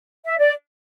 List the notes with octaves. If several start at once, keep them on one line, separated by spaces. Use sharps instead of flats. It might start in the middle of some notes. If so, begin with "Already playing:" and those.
E5
D5